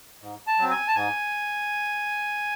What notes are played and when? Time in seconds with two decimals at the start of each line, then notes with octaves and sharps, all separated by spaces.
0.22 G#2
0.47 A5
0.59 F#3 C4
0.71 G#5
0.88 A5
0.95 G#2 G#5